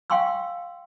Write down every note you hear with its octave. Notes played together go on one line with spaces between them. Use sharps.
F5 G5 G#5 C6 C#6 E6